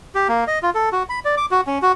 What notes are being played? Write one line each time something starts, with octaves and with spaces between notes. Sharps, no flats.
G4
A#3
D#5
F4
A4
F#4
B5
D5
D6
F#4
C#4
F#4